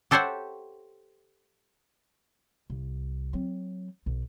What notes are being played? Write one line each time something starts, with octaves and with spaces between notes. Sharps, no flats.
G4 A4 C5 C#5 E5 F#5
C2
F#3 C4
B1